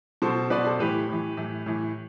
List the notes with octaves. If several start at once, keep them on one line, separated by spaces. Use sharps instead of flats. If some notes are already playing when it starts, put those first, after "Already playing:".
B2 A4 C5
B2 B4 D5
A4 C5
A2 E3 G4 B4
A2 E3
A2 E3
A2 E3